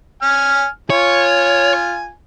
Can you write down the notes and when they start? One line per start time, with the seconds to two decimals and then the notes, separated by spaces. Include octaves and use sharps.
0.22 G#5 F6
0.90 F4 C#5 G#5